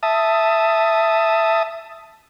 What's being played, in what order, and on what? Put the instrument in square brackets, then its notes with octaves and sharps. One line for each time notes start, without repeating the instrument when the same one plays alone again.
[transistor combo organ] E5 A5 D#6